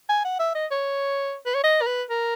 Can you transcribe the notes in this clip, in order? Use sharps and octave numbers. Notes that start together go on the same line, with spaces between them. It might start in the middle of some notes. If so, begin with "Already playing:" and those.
G#5
F#5
E5
D#5
C#5
B4
C#5
D#5
A#4
B4
A#4